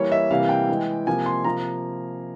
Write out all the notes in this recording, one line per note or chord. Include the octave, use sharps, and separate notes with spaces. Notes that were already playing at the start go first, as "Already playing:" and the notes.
Already playing: E3 G3 A#3 C#5
E5
C3 E3 G3 A#3 F5
G5
E3 G#3
C3 F3 A#3 G#5
C6
C3 F3 A#3 A#5